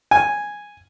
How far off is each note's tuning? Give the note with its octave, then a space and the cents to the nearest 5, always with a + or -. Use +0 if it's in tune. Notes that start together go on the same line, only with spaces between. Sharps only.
G#5 -5